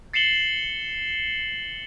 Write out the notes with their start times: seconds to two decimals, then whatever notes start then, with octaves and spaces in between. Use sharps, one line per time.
0.13 A6 C7 C#7 E7 F#7 G7